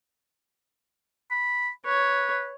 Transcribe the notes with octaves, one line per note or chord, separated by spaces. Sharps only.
B5
B4 C#5